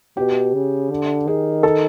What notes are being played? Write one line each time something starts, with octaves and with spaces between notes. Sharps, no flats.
B2 G4
C#3
D3
D#3 G#4
A4